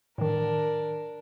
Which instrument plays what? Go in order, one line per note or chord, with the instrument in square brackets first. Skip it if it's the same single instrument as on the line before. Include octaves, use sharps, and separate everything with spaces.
[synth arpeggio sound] A2 D#3 [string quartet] D4 A#4